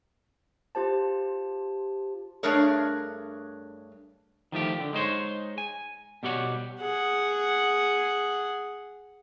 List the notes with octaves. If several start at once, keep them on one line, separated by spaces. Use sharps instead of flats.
F4 G4 C5 A5
G2 A3 D4 G#4 A#4 C#5
D#3 F3 A3 G4
D3
G#3 D#4 C5 C#5
G#5
B2 G3 G4 C#5 F#5
G#4 F#5